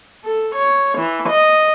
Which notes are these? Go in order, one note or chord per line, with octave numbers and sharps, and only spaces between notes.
A4
C#5
E3
D#5